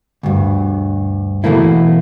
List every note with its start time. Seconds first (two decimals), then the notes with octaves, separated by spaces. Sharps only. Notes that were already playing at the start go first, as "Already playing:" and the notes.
0.23 D2 G2
1.44 B2 E3 A3 A#3 E4